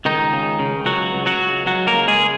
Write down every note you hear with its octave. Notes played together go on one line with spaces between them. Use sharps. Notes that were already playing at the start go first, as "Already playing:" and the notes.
C#2 D#3 D#4
C#3
C#3
C#2 F#3 F#4
C#2
F#3 F#4
C#2
C#2 F#3 F#4
A#3 A#4
C#3
G#3 G#4